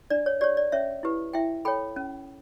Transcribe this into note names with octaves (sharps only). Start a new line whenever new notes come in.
D4 D5
C#5
G4 C#5 D5
D5
C#4 C#5 E5
E4 G4 B4
E4 E5 G5
A4 C#5 G5 B5
C#4